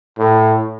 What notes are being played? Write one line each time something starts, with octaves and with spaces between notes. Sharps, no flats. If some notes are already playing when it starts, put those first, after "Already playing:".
A2